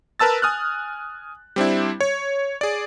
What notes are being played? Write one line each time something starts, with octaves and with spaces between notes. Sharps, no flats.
A#4 B4 A5 E6 A6
G#5 D#6 F6 F#6
G3 C4 D4 E4
C#5
G#4 D5